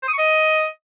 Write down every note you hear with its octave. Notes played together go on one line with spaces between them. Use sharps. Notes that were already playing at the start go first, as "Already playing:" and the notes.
C5
D#6
C#6
D#5